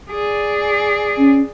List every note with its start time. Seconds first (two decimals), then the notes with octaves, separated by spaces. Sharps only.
0.10 G#4 D5
1.18 C#4